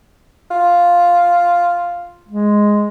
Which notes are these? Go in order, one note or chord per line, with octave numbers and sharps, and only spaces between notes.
F4
G#3